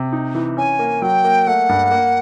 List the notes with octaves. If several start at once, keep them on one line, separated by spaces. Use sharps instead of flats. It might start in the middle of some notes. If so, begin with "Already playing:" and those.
Already playing: C3
D#4
E3
C#4 G#5
A#3
F#3 G5
A#3
A3 F#5
G2
A#3